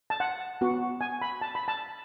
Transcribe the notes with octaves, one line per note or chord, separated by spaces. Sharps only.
A5
F#5
B3 F#4
G#5
B5
A5
B5
A5